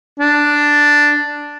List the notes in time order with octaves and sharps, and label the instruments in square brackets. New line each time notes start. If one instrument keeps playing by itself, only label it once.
[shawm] D4